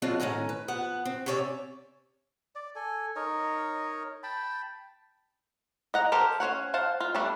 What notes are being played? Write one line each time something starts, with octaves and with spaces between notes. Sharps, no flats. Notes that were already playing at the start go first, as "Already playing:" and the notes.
F#3 G#3 B3 C4 D4 F4
A2 D#3 C#4 G#5 A#5
B4
F3 B3 F#5
C4
C3 C#4 C#5 D5 E5
D5
A4 G#5
D#4 A#4 C#5 D#5
G5 A5 B5
D#5 F#5 A#5
G4 A4 A#4 C5
C#4 C5 C#5 F#5
C5 F5 F#5 A5
F4
G3 A3 B3 D4